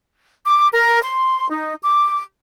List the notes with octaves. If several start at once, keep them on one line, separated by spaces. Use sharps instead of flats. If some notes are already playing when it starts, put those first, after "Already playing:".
D6
A#4
C6
D#4
D6